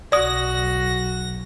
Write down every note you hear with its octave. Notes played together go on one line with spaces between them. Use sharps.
B1 F#4 D5 D#6 A#6